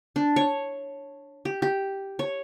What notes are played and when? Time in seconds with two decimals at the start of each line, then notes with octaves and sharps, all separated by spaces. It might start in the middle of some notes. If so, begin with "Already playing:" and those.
0.16 D4
0.36 C#5
1.45 G4
1.62 G4
2.19 C#5